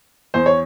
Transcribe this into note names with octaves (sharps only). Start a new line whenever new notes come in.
E2 C5
C#5